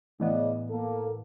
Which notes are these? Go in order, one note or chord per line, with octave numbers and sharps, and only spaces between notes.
A2 C#3 E3 B3 D5 D#5
A#3 A4